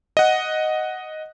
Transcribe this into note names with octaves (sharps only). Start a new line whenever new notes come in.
D#5 F#5